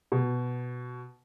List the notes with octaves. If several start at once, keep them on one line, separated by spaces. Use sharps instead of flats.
B2